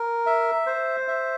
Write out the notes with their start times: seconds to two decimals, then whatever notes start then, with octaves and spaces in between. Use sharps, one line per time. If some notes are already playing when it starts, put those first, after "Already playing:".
Already playing: A#4
0.26 E5
0.66 C5
1.08 E5